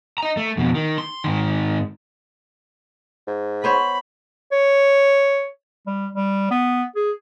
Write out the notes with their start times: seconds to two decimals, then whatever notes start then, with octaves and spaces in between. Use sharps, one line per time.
0.18 D#5 A#5
0.37 A3
0.57 F2 B2
0.75 D#3
0.98 C6
1.24 G#2 D#3
3.27 G#2
3.64 B3 C5 C#5 B5
4.52 C#5
5.87 G3
6.15 G3
6.51 B3
6.96 G#4